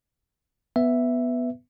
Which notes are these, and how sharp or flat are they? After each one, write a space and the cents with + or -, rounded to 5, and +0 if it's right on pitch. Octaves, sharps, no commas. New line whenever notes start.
B3 +0 B4 +0 E5 +5